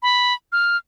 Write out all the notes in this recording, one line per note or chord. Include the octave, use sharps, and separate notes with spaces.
B5
F6